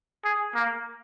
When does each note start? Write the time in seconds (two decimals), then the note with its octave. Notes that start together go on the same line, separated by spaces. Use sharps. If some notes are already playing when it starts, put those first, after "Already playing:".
0.24 G#4
0.54 A#3